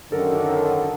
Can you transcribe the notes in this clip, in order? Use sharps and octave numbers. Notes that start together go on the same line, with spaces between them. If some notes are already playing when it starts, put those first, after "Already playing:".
F#2 D3 D#3 A4 A#4